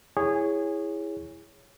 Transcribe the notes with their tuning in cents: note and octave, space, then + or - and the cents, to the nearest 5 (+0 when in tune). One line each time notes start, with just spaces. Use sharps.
E4 +0 G#4 -15 C#5 +0